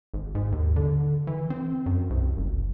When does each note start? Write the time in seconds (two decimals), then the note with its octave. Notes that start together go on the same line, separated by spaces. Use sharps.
0.14 G#1
0.35 G#2
0.52 D#2
0.76 D3
1.27 E3
1.50 C4
1.86 F#2
2.10 C2
2.37 F#1